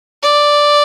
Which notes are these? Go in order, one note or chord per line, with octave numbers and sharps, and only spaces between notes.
D5